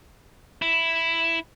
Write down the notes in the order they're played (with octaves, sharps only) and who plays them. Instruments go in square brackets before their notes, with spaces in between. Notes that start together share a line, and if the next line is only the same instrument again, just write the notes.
[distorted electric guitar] E4